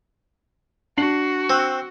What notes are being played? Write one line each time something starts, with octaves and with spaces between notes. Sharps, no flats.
D4 F#4 C7 F#7
C4 E6 F#6